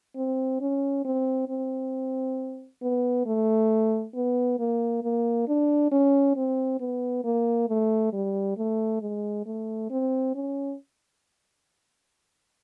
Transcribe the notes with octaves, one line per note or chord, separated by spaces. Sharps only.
C4
C#4
C4
C4
B3
A3
B3
A#3
A#3
D4
C#4
C4
B3
A#3
A3
G3
A3
G#3
A3
C4
C#4